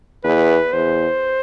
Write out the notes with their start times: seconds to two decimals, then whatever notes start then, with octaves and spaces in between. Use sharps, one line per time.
0.24 E2 B4
0.73 E2 C5